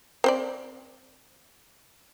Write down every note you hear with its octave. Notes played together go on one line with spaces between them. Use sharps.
C4 C5 D5